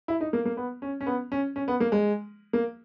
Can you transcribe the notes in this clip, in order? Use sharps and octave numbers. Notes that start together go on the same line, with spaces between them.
E4
D#4
A#3
A#3
B3
C#4
C#4
B3
C#4
C#4
B3
A#3
G#3
A#3